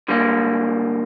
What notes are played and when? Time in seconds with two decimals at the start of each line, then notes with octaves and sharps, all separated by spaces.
0.08 D3 G3 A#3